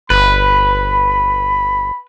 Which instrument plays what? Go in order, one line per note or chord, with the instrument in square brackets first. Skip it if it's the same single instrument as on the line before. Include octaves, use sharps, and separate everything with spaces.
[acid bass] G1 [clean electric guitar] B4 [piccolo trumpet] B5